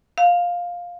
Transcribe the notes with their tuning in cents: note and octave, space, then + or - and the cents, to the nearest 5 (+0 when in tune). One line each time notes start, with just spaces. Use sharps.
F5 +10